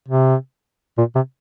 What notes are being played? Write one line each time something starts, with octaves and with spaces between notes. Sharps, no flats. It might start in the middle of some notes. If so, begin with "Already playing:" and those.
C3
A#2
C3